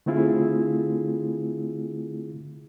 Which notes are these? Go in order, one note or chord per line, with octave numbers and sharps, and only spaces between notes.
D3 A3 C4 E4 F4 G#4